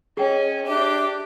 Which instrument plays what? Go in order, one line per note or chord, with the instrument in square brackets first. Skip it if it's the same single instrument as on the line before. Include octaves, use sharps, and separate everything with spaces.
[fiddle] C#4 D#5 [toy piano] G#4 G5
[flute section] D4 E5 D6 [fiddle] G4